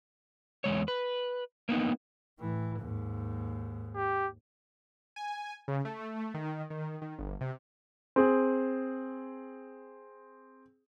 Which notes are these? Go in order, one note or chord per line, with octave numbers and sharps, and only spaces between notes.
E2 G#3 C#5
B4
A#3 B3 D#4
A2 E3
D#2 G#2
G4
G#5
C#3
A3
D#3
D#3
D#3
G1
C3
C4 G#4